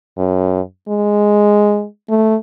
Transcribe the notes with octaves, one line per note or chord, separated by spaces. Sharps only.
F#2
G#3
A3